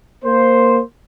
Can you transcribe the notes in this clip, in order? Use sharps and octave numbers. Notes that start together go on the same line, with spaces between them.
A#3 C5